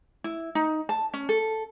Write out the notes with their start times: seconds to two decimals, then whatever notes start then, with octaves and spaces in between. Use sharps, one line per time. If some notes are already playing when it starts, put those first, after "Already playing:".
0.24 E4
0.55 D#4
0.89 A5
1.14 C#4
1.29 A4